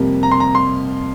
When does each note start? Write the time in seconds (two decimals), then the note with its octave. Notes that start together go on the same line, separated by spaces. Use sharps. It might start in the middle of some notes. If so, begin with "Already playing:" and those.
Already playing: F2 C3 G3 A#3
0.23 A#5
0.31 C6
0.40 A#5
0.55 C6